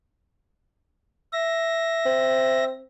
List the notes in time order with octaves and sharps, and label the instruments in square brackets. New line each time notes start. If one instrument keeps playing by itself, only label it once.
[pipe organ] E5 A#6
[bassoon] C4